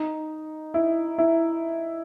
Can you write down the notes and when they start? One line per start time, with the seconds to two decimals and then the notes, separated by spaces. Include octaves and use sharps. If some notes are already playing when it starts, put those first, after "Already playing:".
Already playing: D#4
0.74 E4
1.18 E4